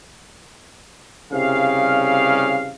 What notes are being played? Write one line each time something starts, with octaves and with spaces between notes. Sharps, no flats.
C2 C#3 G3 F5